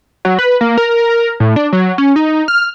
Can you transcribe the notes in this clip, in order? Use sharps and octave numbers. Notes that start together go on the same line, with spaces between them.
F#3
B4
A#3
A#4
A#4
A2
D4
F#3
C#4
D#4
F6